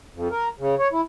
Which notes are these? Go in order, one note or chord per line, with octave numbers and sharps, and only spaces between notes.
F2
A#4
C#3
C#5
E4